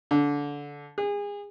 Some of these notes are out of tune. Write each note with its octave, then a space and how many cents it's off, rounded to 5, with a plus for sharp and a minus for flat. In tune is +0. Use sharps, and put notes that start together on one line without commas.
D3 -20
G#4 -30